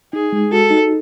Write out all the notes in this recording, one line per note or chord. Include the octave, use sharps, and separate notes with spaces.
D#4 G#4
G#3
F#4 A4
D#4